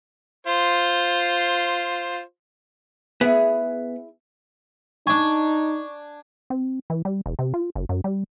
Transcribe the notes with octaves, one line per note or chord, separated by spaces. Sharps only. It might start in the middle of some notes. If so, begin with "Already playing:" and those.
F4 C5
B3 E4 G#4
D4 D#4 G#5 C#6
C4
E3
G3
E1
C3
F4
F#1
F#2
G3